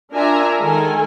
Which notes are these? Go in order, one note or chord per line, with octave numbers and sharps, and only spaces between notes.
D4 F4 A#4 E5 G#5 A#5
D#3 G#3 A4 A#4 G#5